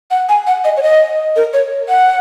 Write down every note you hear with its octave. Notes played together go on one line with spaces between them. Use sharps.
F#5
G#5
F#5
D#5
C#5
D#5
A#4
C#5
F#5